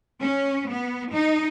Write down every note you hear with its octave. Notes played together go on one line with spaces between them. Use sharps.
C#4
B3
D#4